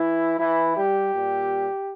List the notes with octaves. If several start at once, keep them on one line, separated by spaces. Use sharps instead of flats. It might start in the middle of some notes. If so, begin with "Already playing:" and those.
Already playing: E3 E4
E3 E4
G3 G4
A#2 G3